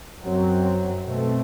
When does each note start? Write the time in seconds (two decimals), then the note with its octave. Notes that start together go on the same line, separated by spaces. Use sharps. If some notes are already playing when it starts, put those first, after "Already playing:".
0.22 F#2 F#3 C4
1.04 B2 A3 C4